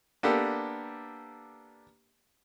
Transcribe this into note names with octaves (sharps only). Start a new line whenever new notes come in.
A#3 B3 D4 G4 A4